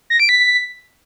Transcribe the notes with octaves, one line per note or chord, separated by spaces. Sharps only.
A#6
D7
B6